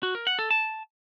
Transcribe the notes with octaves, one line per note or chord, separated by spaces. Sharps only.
F#4
A#4
F#5
A4
A5